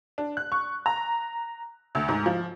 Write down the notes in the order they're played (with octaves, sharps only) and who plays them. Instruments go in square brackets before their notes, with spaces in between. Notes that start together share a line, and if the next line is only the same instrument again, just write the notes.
[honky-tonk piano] D4
F#6
C#6
A#5
D2
G#2
F3